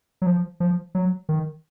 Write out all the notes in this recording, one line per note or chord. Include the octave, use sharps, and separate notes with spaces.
F#3
F3
F3
F#3
D#3